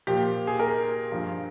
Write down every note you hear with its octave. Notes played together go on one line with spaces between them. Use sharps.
A#2 F3 G4
G#4
A#4
G2 F3